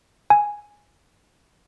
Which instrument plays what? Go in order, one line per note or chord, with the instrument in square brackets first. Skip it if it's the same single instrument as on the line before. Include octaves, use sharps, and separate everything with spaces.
[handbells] G#5